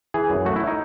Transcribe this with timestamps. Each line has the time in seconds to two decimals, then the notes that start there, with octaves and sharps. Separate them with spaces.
0.14 E3 G#4
0.30 F#2
0.45 A3 F#4
0.56 E4
0.67 D#4